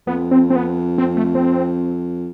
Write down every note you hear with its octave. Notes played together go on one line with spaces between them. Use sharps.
F2 B3
C4
C4
B3
C4
A3
C4